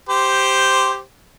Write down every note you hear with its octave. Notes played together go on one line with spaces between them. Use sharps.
G4 C5